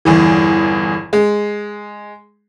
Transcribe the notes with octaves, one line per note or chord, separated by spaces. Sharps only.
G1 E2 E3
G#3